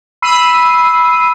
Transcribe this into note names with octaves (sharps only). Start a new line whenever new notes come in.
B5 E6 C7 D#7